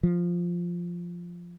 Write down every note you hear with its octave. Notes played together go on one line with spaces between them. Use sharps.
F3